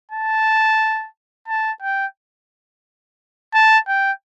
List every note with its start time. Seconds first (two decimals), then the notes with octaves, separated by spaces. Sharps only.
0.11 A5
1.48 A5
1.82 G5
3.54 A5
3.88 G5